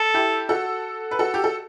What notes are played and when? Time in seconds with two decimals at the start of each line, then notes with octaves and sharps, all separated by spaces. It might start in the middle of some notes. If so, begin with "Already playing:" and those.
Already playing: A4
0.14 E4 G4
0.49 F#4 A4
1.11 B4
1.19 F#4 A4
1.34 G4
1.44 A4